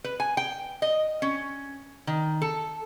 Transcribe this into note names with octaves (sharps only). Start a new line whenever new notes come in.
B4
G#5
G5
D#5
C#4
D#3
A4